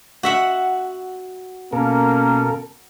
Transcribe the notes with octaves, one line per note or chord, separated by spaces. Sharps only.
F#4 E5 F#5
B2 A#3 C#4 A4 A#4